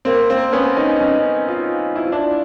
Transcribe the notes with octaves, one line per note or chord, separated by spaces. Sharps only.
A#3 C4
A#3 C4
B3 C#4
C#4 D#4
C#4 D#4
D#4 F4
E4
F4
D4 E4